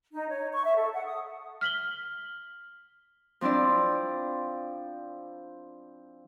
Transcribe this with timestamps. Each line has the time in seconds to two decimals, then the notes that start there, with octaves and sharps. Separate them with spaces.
0.13 D#4
0.29 C#5
0.52 C#6
0.64 E5
0.77 A4
0.92 F#5
1.06 D#6
1.61 F6 B6 F#7 G7
3.41 F3 C4 D4 E4 D5